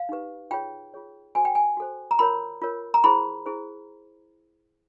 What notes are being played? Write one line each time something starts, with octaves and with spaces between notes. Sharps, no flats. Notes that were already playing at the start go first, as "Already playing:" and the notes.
Already playing: F5
D#4 G4 B4
F4 G#4 C#5 G5
F4 G#4 C#5
F#4 A4 C5 G#5
G5
G#5
F#4 A4 C5
A#5
F4 A#4 C#5 B5
F4 A#4 C#5
A#5
E4 G#4 C5 B5
E4 G#4 C5